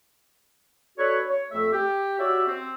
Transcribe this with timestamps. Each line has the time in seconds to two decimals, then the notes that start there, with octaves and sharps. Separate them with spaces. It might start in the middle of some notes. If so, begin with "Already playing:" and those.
0.98 D4 F#4 A4 B4 C#5
1.28 C#5
1.51 F2 A3 A4 E5
1.72 G4
2.19 F#4 G4 C#5 D5 E5
2.48 C4